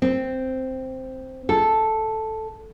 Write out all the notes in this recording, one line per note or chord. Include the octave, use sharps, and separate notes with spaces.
C4
A4